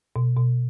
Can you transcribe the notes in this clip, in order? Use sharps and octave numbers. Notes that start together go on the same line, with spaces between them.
B2
B2